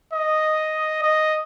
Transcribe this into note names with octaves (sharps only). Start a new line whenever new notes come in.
D#5
D#5